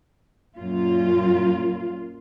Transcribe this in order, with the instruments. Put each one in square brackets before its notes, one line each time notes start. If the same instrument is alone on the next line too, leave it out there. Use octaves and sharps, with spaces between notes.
[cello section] F#2 A#2 F4